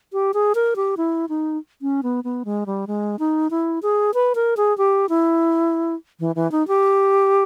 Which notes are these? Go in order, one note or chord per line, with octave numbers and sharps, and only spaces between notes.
G4
G#4
A#4
G4
E4
D#4
C#4
B3
B3
G#3
G3
G#3
D#4
E4
G#4
B4
A#4
G#4
G4
E4
E3
E3
D#4
G4